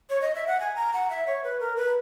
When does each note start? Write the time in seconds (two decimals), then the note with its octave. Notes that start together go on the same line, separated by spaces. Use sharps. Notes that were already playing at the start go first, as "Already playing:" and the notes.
0.10 C#5
0.21 D#5
0.35 E5
0.47 F#5
0.60 G#5
0.76 A#5
0.93 F#5
1.10 E5
1.27 C#5
1.44 B4
1.60 A#4
1.77 B4